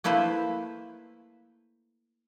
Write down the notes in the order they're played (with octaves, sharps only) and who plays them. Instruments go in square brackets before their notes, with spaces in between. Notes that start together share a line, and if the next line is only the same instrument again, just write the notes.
[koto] A3 A#3 E4 B4 C5